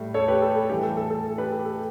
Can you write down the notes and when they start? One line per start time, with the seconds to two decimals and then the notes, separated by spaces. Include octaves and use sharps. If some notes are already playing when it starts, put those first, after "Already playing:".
Already playing: A2 G3
0.14 A4 C#5
0.28 G4 B4
0.42 A4
0.56 A4
0.69 A2 E3 G3 G4
0.83 A4
0.97 A4
1.10 A4
1.24 A4
1.38 G4 B4
1.52 A4
1.59 G4
1.65 A4